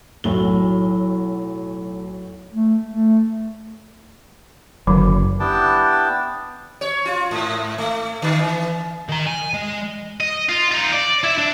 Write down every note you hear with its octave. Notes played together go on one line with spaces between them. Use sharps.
B1 A2 F#3 G7
A3
A3
F#1 D3 D#3 F#3
B3 D4 E4 G4 G5 A5
C#5
F4
G#2
A3
D3
E3
D#3 A#5
G#5
G#3
D#5
F4
D#4 F4
D5
E4 E5
D4